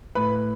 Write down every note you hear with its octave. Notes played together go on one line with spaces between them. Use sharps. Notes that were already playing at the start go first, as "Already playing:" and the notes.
A2 B4 B5